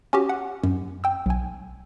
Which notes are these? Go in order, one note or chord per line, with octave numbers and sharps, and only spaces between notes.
C#4 F#4 G4
F#5
F#2
G5 E6
B1 G#5